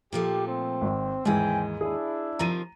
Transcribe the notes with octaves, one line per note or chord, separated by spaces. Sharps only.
A#2 F3 A3 G4
C4
G#1
D#2 G#2 E3 G#3 C4 G5 G#5
D4 E4 G#4
C3 D#3 F3 A#5 D#7